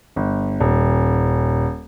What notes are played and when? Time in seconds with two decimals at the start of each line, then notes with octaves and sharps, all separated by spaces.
0.16 G1
0.60 D#1